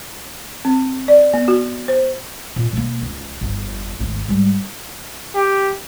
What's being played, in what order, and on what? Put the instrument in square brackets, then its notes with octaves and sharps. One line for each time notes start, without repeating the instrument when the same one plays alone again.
[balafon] C4
D5
B3
F#4
C5
[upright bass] A#2
B2 A#3
C#2
G1 F2
G#1 D2
G#2 G3
[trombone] G4